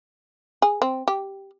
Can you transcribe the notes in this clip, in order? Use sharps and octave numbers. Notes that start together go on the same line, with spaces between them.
G#4
C4
G4